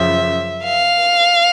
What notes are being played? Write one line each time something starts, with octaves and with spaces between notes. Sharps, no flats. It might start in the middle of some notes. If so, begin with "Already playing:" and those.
Already playing: F#2 C#3 F3 E5
F5